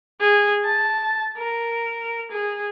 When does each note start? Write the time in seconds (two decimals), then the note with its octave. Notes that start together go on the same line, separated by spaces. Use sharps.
0.20 G#4
0.65 A5
1.38 A#4
2.31 G#4